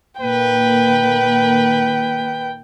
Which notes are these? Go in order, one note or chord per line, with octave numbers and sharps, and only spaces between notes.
A#2 D#3 A#3 B4 G5